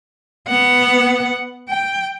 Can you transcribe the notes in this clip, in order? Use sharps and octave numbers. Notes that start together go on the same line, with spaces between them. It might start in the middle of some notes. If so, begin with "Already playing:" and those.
B3 F#5
G5